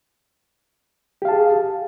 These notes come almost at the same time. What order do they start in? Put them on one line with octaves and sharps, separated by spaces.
G4 F5 A5 G#4